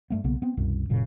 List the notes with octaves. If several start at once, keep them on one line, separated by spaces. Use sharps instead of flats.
G2 A3 B3
B1 C#3 A#3 B3
B3 C4
C2 F#2 B2
F#1 F#2 A#2 C#3